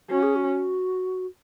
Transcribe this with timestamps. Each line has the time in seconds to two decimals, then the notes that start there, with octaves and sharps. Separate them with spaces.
0.10 C#4 F#4
0.22 G#4
0.35 F#4